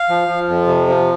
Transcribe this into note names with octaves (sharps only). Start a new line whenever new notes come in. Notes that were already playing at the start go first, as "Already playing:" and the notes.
Already playing: F5
F3
F3
F2
C3
F3